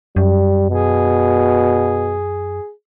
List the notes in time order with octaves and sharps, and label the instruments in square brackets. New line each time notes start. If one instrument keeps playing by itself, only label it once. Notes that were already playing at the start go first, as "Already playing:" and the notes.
[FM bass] F#2 [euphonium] G3
[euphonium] B2 [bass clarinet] G#4